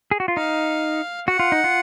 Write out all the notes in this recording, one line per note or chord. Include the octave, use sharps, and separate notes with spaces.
G#4
F#4
F4
D#4 F5
F#4 F#5
F4
D#4
F4